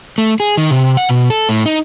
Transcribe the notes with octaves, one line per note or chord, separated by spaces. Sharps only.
A3
G#4
D#3
C3
F#5
B2
A4
A2
D#4